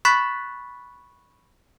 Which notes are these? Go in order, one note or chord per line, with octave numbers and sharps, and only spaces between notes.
B5 C#6 F#6 A6 B6